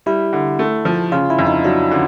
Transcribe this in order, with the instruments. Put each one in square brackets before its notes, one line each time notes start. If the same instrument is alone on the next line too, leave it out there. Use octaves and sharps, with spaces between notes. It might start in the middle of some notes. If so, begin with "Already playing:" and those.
[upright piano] G3 [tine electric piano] E4
[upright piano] D3
A3
F3
[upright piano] C#3 [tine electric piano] F4
[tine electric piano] E4
[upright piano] F2
[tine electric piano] D#4
[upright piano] F#3 [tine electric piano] D4
[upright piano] D3 [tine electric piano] C#4